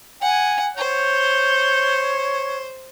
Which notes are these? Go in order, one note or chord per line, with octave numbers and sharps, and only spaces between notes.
F#5 G#5
C5 C#5 G6